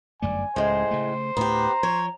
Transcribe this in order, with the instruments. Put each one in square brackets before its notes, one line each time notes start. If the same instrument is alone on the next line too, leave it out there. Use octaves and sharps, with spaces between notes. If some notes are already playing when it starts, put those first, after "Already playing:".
[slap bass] G1 F#2 A3 [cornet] D5 [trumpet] G#5
[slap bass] C#2 [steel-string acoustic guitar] A2 G#3 [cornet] C5
[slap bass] C#3 A3
[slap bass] D2 A2 [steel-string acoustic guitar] B3 G4 [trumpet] A#5
[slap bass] F3 [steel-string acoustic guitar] C#5